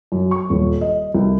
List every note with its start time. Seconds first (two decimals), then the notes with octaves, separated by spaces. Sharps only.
0.12 F#2
0.31 C#6
0.50 D#1
0.81 D#5
1.14 C2